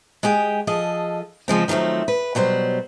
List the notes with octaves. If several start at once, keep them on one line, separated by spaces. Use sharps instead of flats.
G#3 G4 G#4 G5
F3 G#4 A4 D#5
C#3 F3 G#3 C4
D#3 F3 F#3 A3 C4
B4
B2 F#3 G3 C5